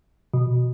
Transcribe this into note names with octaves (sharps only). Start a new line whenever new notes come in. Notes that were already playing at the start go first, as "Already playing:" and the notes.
B2